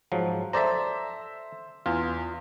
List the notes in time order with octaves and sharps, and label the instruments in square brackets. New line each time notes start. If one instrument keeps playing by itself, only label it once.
[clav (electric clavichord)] G#2 F3 F#3
[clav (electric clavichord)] A4 D5 A#5 [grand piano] C5 E5
[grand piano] E2 [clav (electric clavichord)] F4